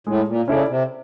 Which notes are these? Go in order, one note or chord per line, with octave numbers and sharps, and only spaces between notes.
A2 G#3
A#2
C#3 C#4 E4 A4 D5
C3